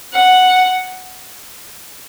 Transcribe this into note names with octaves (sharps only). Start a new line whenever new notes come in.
F#5